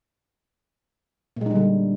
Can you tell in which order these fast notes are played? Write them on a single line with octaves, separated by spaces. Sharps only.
A#2 G#3 D#4 G3 D3